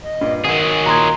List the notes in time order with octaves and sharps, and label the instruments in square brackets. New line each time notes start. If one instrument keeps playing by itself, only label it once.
[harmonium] D#5
[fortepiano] G2 A#2
[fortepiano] G#1 F#5 [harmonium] D#3 [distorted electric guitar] F#3 G#4
[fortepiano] A#2 D#6 [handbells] A#5 C6 G#6